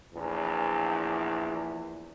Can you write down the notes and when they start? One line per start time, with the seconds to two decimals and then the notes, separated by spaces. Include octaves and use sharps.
0.14 A#1 E2